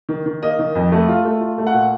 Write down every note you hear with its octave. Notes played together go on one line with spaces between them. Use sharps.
D#3
D#3
A#3 D#5
D#3
F2
A3
F4
A3
F4
A3
F#5
A#2